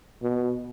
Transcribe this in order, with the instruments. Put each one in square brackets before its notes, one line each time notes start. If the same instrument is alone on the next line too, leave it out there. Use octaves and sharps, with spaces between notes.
[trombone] B2